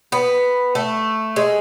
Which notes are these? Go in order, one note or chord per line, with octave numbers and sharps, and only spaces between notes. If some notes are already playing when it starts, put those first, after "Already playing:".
B3
A3
G#3